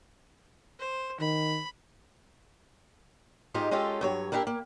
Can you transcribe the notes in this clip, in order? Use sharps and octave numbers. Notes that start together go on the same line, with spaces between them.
C5
D#3 B5
G#2 G#3 D#4 F4 G4
G#3 C#4 F4 G4 A4
G2 F#3 C#5
A#3 B3 D4 E4 G4 A#4
A#3